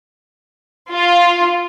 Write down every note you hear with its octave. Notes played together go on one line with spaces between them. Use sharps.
F4